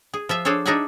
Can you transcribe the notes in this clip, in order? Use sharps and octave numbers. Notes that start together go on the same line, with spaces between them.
G#4
F3 F4 E5
D4 G#4 A4 C5 C#5
D4 D#4 G#4 E5 F#5 G#5